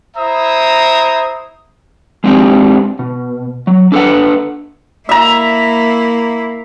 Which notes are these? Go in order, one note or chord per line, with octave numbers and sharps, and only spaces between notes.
E4 C5 E5 A#5 D#6
G#3 A3 C4 D4 D#4 G4
B2
F#3
D4 A4 B4 F#5
A#3 E4 E5 A#5